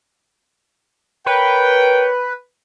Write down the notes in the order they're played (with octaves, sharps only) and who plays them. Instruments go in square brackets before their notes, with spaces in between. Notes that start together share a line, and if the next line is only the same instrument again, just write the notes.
[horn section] A#4 C#5 G5 [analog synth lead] B4